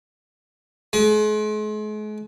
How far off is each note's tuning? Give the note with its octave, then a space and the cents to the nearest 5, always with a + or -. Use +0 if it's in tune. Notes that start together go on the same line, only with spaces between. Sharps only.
G#3 +40